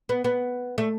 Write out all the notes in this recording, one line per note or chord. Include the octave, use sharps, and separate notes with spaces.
B3
B3
A3